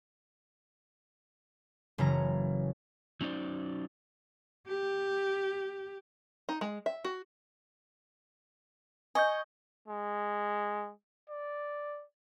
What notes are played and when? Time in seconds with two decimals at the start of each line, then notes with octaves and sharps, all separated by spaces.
1.98 F#1 C#3 E3 C#4 A#5 A#6
3.21 F#3 C#4 D#4 C5 D5
4.67 G4
6.49 D#4
6.61 G#3
6.86 E5
7.04 F#4
9.15 D#5 G#5 C#6 G6
9.88 G#3
11.29 D5